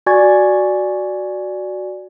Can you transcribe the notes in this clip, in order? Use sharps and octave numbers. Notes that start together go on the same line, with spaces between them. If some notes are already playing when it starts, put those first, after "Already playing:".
F#4 D5 G#5 C#6 G#6 A6